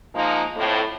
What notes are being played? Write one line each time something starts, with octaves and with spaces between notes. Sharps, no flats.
F3 G#3 A#3 D#4
F2 A2